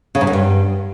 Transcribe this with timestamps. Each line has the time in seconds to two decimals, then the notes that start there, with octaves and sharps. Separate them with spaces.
0.15 C#3
0.21 G#2
0.27 F#2
0.33 G2